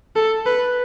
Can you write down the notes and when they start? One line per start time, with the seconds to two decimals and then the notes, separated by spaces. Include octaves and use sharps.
0.16 A4
0.46 B4